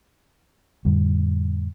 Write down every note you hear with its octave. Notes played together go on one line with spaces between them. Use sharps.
F2 A2 D3 G3